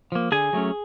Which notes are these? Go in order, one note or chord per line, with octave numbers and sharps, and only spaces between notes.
F3 A#3
D3 G#4 G#5
F#3 A3 C#4